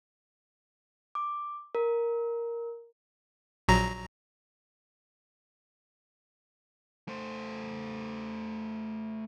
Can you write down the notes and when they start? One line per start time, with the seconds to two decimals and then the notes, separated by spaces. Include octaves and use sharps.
1.15 D6
1.75 A#4
3.68 A#1 F#3 A#5
7.08 A3 C5